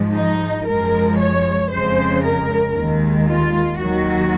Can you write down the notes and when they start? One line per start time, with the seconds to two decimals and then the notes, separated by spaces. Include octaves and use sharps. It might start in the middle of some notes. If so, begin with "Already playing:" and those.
Already playing: G#2 F3 G#3
0.13 D#4
0.66 F#2 F3 G#3 A#4
1.18 C#5
1.70 F2 C#3 G#3 C5
2.23 A#4
2.75 D#2 D#3 G#3
3.28 F4
3.80 D#2 D#3 F#3 F#4